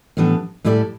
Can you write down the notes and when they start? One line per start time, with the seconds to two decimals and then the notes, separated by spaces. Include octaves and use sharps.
0.17 A2 E3 G3 B3 D4
0.64 A2 G3 E4 A4 D5